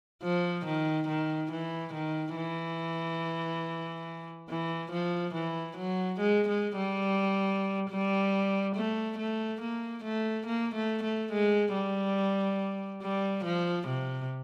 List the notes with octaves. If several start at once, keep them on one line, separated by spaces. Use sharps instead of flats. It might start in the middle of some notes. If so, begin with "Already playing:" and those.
F3
D#3
D#3
E3
D#3
E3
E3
F3
E3
F#3
G#3
G#3
G3
G3
A3
A3
A#3
A3
A#3
A3
A3
G#3
G3
G3
F3
C3